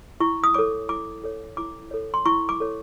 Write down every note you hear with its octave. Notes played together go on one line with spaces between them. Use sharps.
E4 C#6
D#6
A4 C#5 D6
E4 D6
A4 C#5
E4 D6
A4 C#5
C6
E4 C#6
D6
A4 C#5